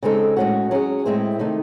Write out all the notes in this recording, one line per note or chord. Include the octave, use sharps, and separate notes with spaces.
C#3 G#3 C4 D#4 A4
A2 G#3 C#4 F#4
F#3 C#4 G#4
A2 G#3 C4 E4 C5
C3 D#3 A3 D#4